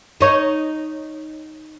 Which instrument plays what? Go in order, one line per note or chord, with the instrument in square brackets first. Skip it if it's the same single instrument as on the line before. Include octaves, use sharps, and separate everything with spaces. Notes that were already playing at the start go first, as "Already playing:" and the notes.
[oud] D#4 C#5